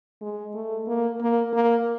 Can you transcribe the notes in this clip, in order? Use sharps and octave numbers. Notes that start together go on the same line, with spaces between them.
G#3
A3
A#3
A#3
A#3